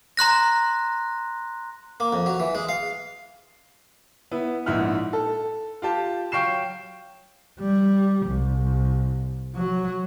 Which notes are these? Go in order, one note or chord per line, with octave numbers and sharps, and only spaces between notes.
A#5 C6 F#6 A#6
A#3
F2
F#3
E3
G#3
F5
B3 E4
A#1 G#2 E4 F#5 F6
A4
F4 G4 A5
F#3 F5 G5 C#6 C7 E7
G3
C2
F#3